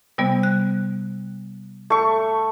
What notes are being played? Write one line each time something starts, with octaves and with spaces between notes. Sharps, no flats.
C3 G3 B3
F#6
A3 C#6